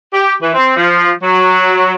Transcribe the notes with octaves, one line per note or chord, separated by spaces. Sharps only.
G4
E3
C4
F3
F#3